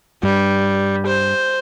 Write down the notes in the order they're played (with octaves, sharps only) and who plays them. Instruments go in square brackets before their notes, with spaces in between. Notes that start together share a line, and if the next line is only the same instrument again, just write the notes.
[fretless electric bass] G2 [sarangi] G3
[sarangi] C5